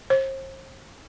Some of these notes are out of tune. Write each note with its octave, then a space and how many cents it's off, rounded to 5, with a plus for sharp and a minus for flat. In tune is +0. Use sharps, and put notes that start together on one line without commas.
C5 +40